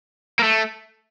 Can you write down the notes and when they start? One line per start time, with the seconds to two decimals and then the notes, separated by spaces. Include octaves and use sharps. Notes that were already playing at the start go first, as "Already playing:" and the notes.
0.39 A#3
0.43 A3